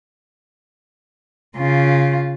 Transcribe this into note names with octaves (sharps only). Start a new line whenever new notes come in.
C#3 F4